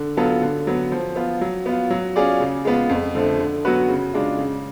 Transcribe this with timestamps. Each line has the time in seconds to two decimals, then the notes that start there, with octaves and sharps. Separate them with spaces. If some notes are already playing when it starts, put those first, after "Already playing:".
Already playing: D3
0.17 F#3 B3 F4 A4
0.42 D3
0.67 F#3 B3
0.92 F3
1.16 B3 F4
1.41 F#3
1.66 B3 F4
1.90 F#3
2.16 C#4 F4 G#4 D5
2.40 C#3
2.65 G#3 B3 F4
2.89 F2
3.15 D3 F3 A3
3.40 D3
3.65 F#3 B3 F#4 B4
3.89 C#3
4.14 G#3 D4 F4
4.38 C#3